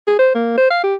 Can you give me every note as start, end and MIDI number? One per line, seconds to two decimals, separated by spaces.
0.07 0.18 68
0.19 0.30 72
0.35 0.53 58
0.57 0.68 72
0.70 0.78 77
0.83 0.95 67